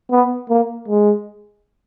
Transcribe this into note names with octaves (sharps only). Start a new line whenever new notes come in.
B3
A#3
G#3